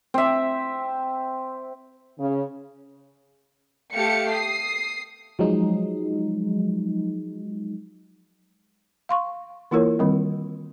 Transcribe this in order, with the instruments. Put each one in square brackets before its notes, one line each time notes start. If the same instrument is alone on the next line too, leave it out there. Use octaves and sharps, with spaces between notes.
[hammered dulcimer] C4 E5
[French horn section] C#3
[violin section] A3 G4 F5 C#7
D#6 C7
[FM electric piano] F3 F#3 G#3 D#4
[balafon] F5 C6 C#6
E3 A#3 E4 F4 A#4 C#5
D#3 G3 C4